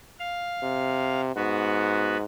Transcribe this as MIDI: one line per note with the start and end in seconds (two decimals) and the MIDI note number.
0.19 1.21 77
0.63 1.31 48
1.36 2.24 44
1.36 2.17 59
1.36 2.17 66